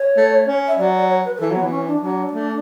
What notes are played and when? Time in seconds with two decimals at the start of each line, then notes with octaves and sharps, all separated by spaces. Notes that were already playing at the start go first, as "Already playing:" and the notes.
Already playing: C#5
0.17 A3
0.48 C#4
0.68 E5
0.78 F#3 D5
0.94 D5
1.09 C#5
1.25 B4
1.36 B4
1.40 E3 A4
1.52 F#3 B3
1.63 E3
1.71 C#4
1.87 D4
2.02 F#3 D4
2.33 A3